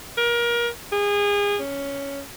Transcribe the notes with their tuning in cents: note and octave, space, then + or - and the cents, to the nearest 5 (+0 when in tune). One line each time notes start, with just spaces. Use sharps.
A#4 +25
G#4 -30
C#4 +10